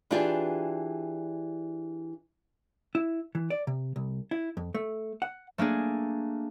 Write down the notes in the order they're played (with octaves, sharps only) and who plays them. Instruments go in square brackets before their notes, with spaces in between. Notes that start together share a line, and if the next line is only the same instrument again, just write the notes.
[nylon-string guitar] E3 D4 F4 G4 G#4
[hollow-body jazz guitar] E4
E3
D5
C3
C2
E4
F2
A3
F#5
[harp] A3 A#3 D4 G#4